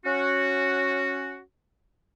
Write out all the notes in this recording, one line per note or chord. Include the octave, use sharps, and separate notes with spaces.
C#4 F#4